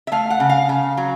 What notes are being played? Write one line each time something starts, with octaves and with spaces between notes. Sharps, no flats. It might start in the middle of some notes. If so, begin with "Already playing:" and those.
E5
A3 F5
F#5
C#3
F5
C#3
F#3